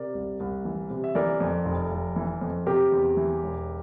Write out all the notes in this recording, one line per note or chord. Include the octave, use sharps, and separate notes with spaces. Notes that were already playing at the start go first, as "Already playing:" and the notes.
Already playing: C3 A#4 D5
C2
C2
E3
C3
E5
E3 A#4 D5
F2
F1
F1
E3
F2
C3 G4 A#4
E2
E3
E1